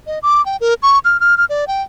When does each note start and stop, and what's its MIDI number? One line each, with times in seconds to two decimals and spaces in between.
0.07 0.19 75
0.23 0.44 86
0.46 0.57 79
0.61 0.74 70
0.83 0.99 85
1.05 1.20 89
1.20 1.38 89
1.38 1.45 89
1.49 1.67 74
1.68 1.82 79